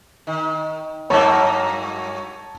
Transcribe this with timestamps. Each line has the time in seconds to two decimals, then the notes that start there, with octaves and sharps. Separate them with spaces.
0.27 D#3
1.10 G2 F#3 A#3 C#5 A5 C#6